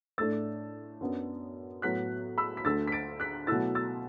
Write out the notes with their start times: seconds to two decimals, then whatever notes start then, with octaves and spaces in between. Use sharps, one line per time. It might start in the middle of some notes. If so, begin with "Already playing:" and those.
0.18 A2 A3 D4 E6 A6
1.01 F#2 F#3 B3 D4
1.82 A2 F#3 B3 F#6 B6
2.38 B5 E6
2.57 B6
2.65 D2 D3 A3 E6 A6
2.88 B6
2.92 A6 D7
3.20 F#6 B6
3.47 B2 F#3 A3 E4 E6 A6
3.75 E6 A6